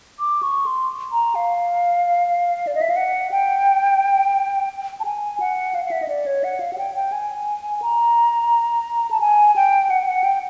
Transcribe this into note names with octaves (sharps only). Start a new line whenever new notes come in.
D6
C#6
C6
A#5
F5
D5
D#5
E5
F5
F#5
G5
A5
G#5
F#5
F5
F5
E5
D#5
D5
C#5
F#5
F5
F#5
G5
G5
G#5
A#5
A5
G#5
G5
F#5
F#5
G5